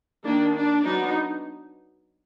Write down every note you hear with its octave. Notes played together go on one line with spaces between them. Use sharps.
D#3 A#3 D4
D4
F#3 B3 D4 D#4